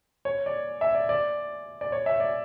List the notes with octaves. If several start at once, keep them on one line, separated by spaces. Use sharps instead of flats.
C#5
D5
E5
D5
D5
D5
C#5
E5
D5